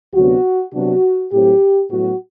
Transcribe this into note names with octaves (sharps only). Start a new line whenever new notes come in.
D2 C3 F#3 B3 D4 F#4
C3 F#3 B3 D4 F#4
A2 F#3 C4 G4
A2 F#3 B3 F#4